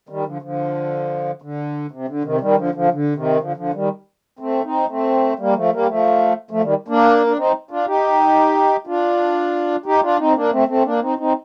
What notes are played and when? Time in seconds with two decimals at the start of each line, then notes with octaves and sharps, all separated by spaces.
0.09 D#3 G3
0.26 D3 F3
0.42 D3 F3
1.42 D3
1.91 C3
2.08 D3
2.24 C3 D#3
2.40 D#3 G3
2.57 D3 F3
2.74 D3 F3
2.91 D3
3.15 C3 D#3
3.40 D3 F3
3.56 D3 F3
3.74 D#3 G3
4.39 A3 C4
4.64 C4 D#4
4.89 A3 C4
5.39 G3 A#3
5.55 F3 A3
5.72 G3 A#3
5.88 F3 A3
6.51 F3 A3
6.63 D#3 G3
6.88 A#3 D4
7.27 D4
7.37 C4 D#4
7.71 D4 F4
7.87 D#4 G4
8.87 D4 F4
9.86 D#4 G4
10.02 D4 F4
10.18 C4 D#4
10.36 A#3 D4
10.52 A3 C4
10.68 A3 C4
10.85 A#3 D4
11.01 C4 D#4
11.18 C4 D#4